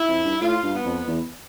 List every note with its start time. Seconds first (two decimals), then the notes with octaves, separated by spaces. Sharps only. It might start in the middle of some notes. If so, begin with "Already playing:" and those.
Already playing: E4
0.08 F2
0.24 G2
0.41 A2 F4
0.63 G2
0.74 B3
0.85 F2
1.07 E2